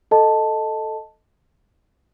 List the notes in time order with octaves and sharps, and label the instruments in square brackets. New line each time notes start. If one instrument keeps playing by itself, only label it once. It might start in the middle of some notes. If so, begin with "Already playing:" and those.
[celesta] A4 D#5 A5